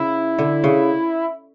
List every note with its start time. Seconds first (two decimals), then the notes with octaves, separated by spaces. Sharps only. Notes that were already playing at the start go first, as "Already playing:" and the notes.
Already playing: C#3 E4
0.39 D3
0.64 C#3